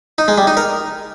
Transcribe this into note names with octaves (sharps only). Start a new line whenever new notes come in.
D#4
G#3
G3
D#4
A#4